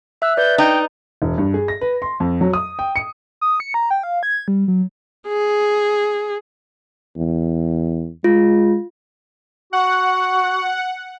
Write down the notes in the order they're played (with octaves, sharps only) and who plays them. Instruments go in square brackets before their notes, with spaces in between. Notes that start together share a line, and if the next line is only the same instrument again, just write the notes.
[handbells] E5 F#6 [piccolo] E6
[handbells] B4 D5 [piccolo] G6
[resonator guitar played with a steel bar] D#4 [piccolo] G5
[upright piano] E1
G2
G#4
A#6
B4
C6
F2
F#3
D#6
G5
C#7
[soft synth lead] D#6
C#7
A#5
G5
F5
G#6
G3
F#3
[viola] G#4
[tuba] E2
[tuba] G#3 [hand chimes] F4
[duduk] F#4 [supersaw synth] F#5